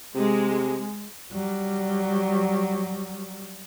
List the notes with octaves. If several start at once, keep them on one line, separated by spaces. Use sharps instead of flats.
C3 G#3
F#3 G3